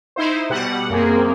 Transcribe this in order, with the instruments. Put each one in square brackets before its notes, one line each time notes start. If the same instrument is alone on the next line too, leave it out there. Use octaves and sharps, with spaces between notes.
[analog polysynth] D#4 E4 C5
B2 G3 F#5
[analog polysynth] F#2 G#4 [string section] A#3 C4